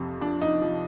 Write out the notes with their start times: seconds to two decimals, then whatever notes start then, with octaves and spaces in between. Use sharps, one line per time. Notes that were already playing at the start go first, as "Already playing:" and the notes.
Already playing: F2 C3
0.21 F3 D4
0.42 D#4
0.62 F3